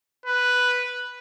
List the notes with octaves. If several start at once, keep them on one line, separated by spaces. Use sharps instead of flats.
B4